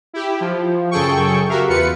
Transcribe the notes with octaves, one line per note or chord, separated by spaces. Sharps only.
E4 G4
F3
F#2 C#3 G#4 A4 G5 C#6
F#4 G4 A#4 E5 F5
E2 F4 B4 C#7